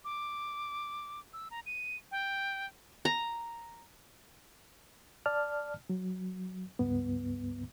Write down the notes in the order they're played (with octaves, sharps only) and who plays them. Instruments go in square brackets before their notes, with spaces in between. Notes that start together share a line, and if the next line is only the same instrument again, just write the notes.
[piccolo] D6
E6
A#5
D#7
G5
[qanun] A#5
[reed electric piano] D5 A5 F6
F#3
C#2 G2 B3